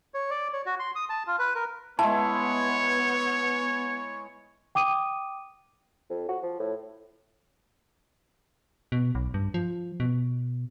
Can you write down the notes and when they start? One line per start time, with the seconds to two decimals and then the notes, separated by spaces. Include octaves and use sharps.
0.14 C#5
0.30 D5
0.53 C#5
0.66 F#4
0.79 C6
0.95 D#6
1.10 A5
1.27 F4
1.39 B4
1.55 A#4
1.99 G#3 B3 E4 C#5 A5
4.75 G5 D6 D#6 D#7
6.10 F2
6.29 F#4
6.43 F3
6.59 A2
8.92 B2
9.15 B1
9.34 G2
9.54 F3
10.00 B2